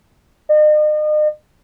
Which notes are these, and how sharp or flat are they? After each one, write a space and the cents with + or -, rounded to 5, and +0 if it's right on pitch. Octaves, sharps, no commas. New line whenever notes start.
D#5 -40